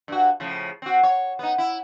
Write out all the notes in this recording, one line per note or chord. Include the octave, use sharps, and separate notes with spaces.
G2 F#4
A2 C#3 F3
C4 F#4
C#5
B3 D#4
E4